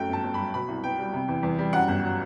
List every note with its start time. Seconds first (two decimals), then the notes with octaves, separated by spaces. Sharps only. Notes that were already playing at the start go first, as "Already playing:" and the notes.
Already playing: F#2 A3 G5
0.09 G1 A5
0.23 G1
0.34 F#3 B5
0.54 B2 B5
0.68 C2
0.84 B3 G5
0.98 G3
1.13 C3
1.28 E2
1.43 E2
1.59 G3
1.73 F#2 F#5
1.88 G1
2.03 F#3